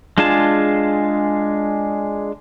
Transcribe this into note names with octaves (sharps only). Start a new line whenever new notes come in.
G#3 D4 F4 G#4 A5